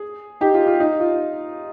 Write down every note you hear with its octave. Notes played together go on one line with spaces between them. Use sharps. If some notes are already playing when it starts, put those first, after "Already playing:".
Already playing: G#4
D#4 G4
F4
F4
D#4
F4